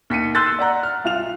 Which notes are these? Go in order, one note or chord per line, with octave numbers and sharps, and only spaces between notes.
D#2 B6 C#7 D#7
C6 E6 F#6 G6 A6
E6
D5 F#5 A#5
F6
C2 F4 F6 F7